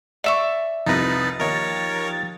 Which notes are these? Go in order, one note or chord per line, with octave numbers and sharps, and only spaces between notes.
D5 E5 C#6
C2 F2 F3 D#4 B4 A6 A#6
D#2 D#4 A#4 C#5